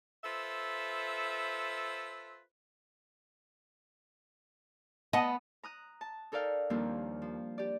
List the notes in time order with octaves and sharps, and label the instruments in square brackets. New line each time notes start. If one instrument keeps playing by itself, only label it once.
[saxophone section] F4 A4 B4 C5 E5
[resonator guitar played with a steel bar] B3 A5 [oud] D#5
[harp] A#5 D#6 F#6
A5
D#4 A4 A#4 D5 F5 G5
D#2 F3 G3 A#3 C4 D4
F3
G4 D5